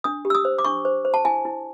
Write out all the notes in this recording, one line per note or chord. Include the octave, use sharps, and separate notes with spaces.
D4 D#6
G4
E6
D#6
C5
D6
D4 C#6
C5
C5
A5
E4 G#5
E4